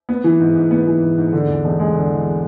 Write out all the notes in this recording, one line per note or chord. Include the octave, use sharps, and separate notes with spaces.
B3
E3
G#2
G#2
B3
E3
G#2
G#2
D3
E2
E1
G#3
D3
E2